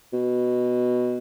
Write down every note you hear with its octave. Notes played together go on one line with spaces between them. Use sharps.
B2